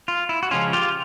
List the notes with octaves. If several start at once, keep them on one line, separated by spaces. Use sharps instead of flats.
F4
E4
F#4
C#3 F3 G#3 C#4 F4
F4 G4